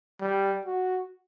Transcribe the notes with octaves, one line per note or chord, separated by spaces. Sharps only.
G3
F#4